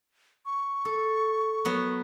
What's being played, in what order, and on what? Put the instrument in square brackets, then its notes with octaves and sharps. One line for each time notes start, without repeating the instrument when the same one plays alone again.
[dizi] C#6
[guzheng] A4
F#3 B3